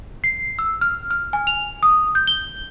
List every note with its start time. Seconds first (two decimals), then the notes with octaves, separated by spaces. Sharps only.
0.24 C7
0.59 E6
0.81 F6
1.10 F6
1.33 G#5
1.47 F7
1.83 D#6
2.15 G6
2.27 G7